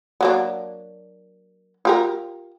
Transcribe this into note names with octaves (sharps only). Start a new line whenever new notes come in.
F#3 A#3 D4
F4 G4 A#4